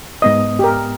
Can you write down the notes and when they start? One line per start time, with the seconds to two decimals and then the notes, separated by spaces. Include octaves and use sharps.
0.22 G#2 B3 D#5 D#6
0.59 G4 A#4